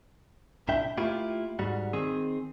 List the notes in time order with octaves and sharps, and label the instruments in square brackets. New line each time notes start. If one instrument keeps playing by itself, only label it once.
[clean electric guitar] C2 A#2 D4 E4 E5 G5
A3 A#3 E4 F4 G4
G#2 G3 F#4
D#3 C4 G#4